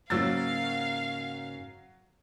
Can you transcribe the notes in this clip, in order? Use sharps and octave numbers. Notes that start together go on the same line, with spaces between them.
G#2 C#3 F#3 A#3 F5 E6 A6